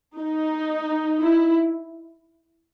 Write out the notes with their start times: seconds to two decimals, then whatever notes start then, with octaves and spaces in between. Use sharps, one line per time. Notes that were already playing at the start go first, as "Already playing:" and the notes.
0.19 D#4
1.21 E4